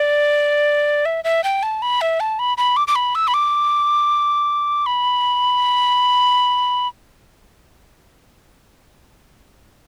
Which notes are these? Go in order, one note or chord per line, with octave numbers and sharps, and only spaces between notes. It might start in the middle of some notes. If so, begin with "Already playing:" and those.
Already playing: D5
E5
E5
G5
A5
B5
E5
A5
B5
B5
D6
D6
B5
E6
B5
D6
B5